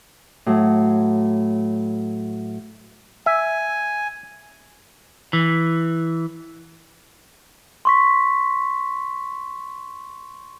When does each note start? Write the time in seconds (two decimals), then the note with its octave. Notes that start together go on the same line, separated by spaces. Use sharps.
0.46 A2 F#3
3.26 E5 G#5
5.33 E3
7.85 C6 C#6 B6